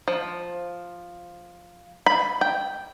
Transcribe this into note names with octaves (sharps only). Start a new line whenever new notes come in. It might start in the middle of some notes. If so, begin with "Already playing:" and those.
F3
B5
G5